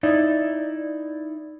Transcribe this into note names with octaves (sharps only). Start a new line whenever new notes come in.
D#4 E4 D5